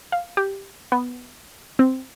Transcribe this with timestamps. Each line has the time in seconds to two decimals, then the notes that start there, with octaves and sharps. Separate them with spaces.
0.12 F5
0.37 G4
0.92 B3
1.79 C4